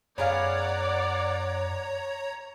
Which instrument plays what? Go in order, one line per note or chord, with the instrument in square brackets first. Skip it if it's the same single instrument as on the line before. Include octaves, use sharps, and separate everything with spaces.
[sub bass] F#2 [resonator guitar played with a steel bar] B3 G#4 F5 [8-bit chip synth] C#5 A#5 [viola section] D5 F#5